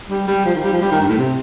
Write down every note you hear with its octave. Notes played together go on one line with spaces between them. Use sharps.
G3
G3
F3
D#3
G3
F3
G3
D#3
G2
A2
C3